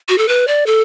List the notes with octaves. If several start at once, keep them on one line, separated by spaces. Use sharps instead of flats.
F#4
A4
B4
D5
A4